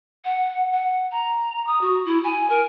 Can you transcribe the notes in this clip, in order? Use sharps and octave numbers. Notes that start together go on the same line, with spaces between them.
F#5
F#5
A#5
D#6
F#4
E4
G#5
A#4